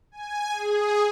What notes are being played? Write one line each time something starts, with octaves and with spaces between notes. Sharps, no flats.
G#5
G#4